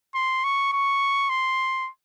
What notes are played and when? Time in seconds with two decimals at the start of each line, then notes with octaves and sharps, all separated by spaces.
0.15 C6
0.44 C#6
0.73 C#6
1.30 C6